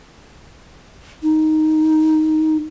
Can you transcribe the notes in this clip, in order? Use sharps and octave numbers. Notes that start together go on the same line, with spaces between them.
D#4